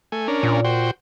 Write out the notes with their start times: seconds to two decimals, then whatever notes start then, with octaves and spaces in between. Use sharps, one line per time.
0.12 A3 G#5
0.28 C#4 D4 A#4
0.43 A#2
0.64 F#4 C5 G5